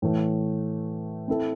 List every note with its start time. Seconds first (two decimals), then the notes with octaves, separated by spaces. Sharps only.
0.02 A2 E3 A3
1.28 C4 E4 A4